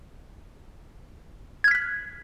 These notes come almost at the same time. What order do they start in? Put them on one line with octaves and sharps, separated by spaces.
G#6 F6 B6 F#6